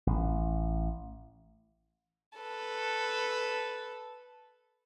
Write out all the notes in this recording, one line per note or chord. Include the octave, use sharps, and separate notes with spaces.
A1
A4 B4